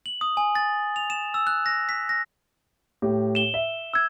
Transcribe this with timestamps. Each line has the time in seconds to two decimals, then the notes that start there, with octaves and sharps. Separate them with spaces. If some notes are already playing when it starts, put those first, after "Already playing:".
0.06 F#7
0.21 D#6
0.37 G#5
0.55 A6
0.96 F7
1.10 E7
1.34 E6
1.47 F#6
1.66 A#6
1.89 B6
2.09 A#6
3.02 A2 G4
3.35 E7 G7
3.54 E5
3.94 E6 G#6